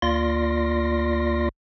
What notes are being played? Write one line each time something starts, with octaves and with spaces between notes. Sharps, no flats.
D2 A#3 F4 D5 C6 A#6